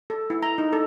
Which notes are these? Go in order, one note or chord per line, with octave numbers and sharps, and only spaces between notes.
A4
E4
A#5
D#4
A4